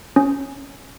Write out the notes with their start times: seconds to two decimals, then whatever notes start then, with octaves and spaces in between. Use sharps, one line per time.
0.16 C#4